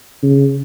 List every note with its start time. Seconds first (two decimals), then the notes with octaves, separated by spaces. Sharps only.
0.23 C#3